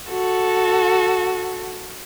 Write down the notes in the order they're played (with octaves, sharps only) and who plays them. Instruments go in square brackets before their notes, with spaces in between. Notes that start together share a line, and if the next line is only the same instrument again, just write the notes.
[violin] F#4 A4